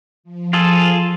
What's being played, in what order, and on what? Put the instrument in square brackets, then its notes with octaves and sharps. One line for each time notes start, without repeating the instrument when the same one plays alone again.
[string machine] F3
[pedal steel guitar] F4 G#4 A4